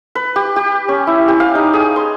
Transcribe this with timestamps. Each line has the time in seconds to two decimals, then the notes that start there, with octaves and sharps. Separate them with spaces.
0.15 B4
0.36 G4
0.56 G4
0.89 C#4
1.07 E4
1.28 G4
1.40 F5
1.55 D#4
1.73 G#4
1.96 C6